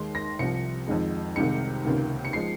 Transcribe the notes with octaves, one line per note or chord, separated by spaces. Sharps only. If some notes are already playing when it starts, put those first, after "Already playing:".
Already playing: D#2 D#3 G#3 C6
A#6
C2 C3 F3 C#7
F2 D#3 G#3
C2 C3 D#3 G#3 C#7
C#2 C3 D#3 A#3
C#7
F3 G#3 C7